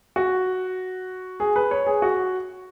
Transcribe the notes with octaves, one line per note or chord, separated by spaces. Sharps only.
F#4
G#4
B4
C#5
G#4
F#4